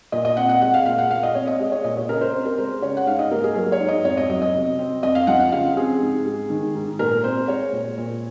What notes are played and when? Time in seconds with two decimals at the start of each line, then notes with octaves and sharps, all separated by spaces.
0.12 A#2 D#5
0.25 D#5
0.37 C4 F#5
0.49 F#5
0.61 G#3 F#5
0.74 F5
0.86 A#2 F5
0.98 F#5
1.11 A#2 F5
1.23 D#5
1.35 C4 C#5
1.47 D#5
1.59 G#3 D#5
1.72 C#5
1.84 A#2 D#5
1.97 C#5
2.09 C#3 A#4
2.21 C5
2.33 C4 C5
2.45 A#4
2.58 G#3 C5
2.82 C#3 C#5
2.97 F#5
3.07 G#2 F5
3.19 D#5
3.31 A#3 A#4
3.44 G#4
3.56 F#3 A#4
3.72 C#5
3.80 G#2
3.89 D#5
4.05 F2 C#5
4.17 D#5
4.30 F#3 D#5
4.42 D#5
4.54 C3
4.79 C4
5.03 F2 D#5
5.15 F5
5.27 F3 F#5
5.40 F#5
5.52 C#3 F5
5.77 C4 G#4
6.01 G#2
6.25 G#3
6.50 D#3
6.75 G#2
6.99 A#2 A#4
7.24 C4 C5
7.48 G#3 C#5
7.73 A#2
7.98 A#2